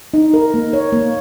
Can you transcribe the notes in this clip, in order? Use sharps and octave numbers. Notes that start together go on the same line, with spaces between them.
D#4
A#4
A#3
C#5
A#3